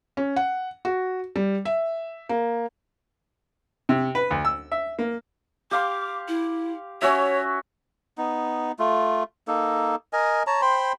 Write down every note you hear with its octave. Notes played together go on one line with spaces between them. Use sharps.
C#4
F#5
F#4
G3
E5
A#3
C3
B4
D2
E6
E5
A#3
G4 F5 C6 D6
E4
C#4 F#4 C#5 E5
B3 D#4
A3 F4
A#3 D#4 A4
A#4 D#5 G#5
C#5 A5 A#5
C5 G5 B5 C6